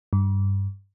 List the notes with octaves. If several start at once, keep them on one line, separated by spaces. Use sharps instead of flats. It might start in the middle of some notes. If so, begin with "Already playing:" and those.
G2